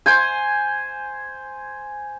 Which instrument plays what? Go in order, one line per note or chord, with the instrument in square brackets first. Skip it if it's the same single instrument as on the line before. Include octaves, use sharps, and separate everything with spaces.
[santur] C5 G#5